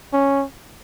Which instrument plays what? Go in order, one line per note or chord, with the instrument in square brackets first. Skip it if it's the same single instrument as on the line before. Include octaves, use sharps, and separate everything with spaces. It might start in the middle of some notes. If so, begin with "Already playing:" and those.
[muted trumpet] C#4